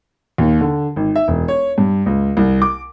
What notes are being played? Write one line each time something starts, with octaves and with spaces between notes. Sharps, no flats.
D#2
D3
G#1
E5
E1
C#5
G2
C#2
C2
D6